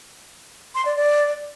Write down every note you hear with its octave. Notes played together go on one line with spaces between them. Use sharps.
C6
D5
D5